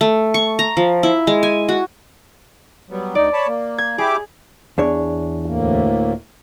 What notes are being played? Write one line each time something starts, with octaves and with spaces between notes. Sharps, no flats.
A3
C#6
A#5
F3
E4
G#3
G#5
F#4
F#3 G3 B3
D2 D#4 D5
C#5 A5 B5
A#3
G#6
E4 G4 G#4 D6
E2 D4 C#5
D2 A2 A#3